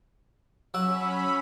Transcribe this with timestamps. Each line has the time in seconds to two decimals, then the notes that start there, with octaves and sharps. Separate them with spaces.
0.74 F#3 C#4 F#5 B5 E6